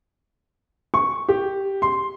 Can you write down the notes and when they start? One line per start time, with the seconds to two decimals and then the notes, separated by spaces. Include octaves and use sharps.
0.94 C#6
1.29 G4
1.82 C6